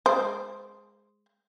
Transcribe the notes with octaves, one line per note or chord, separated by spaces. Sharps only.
G#3 C5